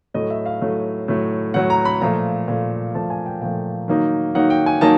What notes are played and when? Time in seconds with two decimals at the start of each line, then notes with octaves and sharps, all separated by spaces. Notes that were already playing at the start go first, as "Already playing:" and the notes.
0.14 A2 F#3 A3 D#5
0.30 E5
0.46 F5
0.61 A2 F#3 A3
1.08 A2 F#3 A3
1.54 A2 F#3 A3 F#5
1.70 A#5
1.85 B5
2.01 A#2 F3 A3 A#5
2.48 A#2 F3 A3
2.95 A#2 F3 A3 A5
3.10 G#5
3.26 G5
3.41 A#2 F3 A3 G5
3.88 D#3 F#3 A#3 D#4
4.35 D#3 F#3 A#3 D#4 F#5
4.50 G5
4.66 G#5
4.81 D#3 F#3 A#3 D#4 A5